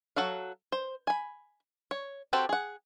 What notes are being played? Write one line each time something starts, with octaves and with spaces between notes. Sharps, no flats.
F#3 F#4 A4 F5
C5
G#5 B5
C#5
C4 F#4 G4 A4 C5
G#4 F#5